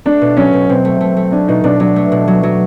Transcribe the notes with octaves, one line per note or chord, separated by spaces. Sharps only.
A3 D4
B2
F#3 C#4
B2
B2 C4
A3
A3
A3
C#4 D4
B2 D#4
B2 D4
F#3 D4
A3
B2
F#3
F#3